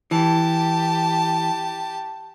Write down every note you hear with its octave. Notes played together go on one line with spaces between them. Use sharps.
E3 G4 A5